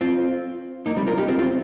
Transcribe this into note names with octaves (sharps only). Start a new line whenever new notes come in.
C4 F4
A#3 D#4
G3 C4
F4 A#4
D#4 G4
C4 F4
C4 F4